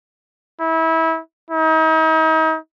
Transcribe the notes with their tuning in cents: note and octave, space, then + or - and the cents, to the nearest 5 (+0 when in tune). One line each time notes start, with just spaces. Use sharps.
E4 -25
D#4 +40